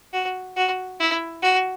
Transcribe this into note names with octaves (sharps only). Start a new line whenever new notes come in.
F#4
F#4
E4
F#4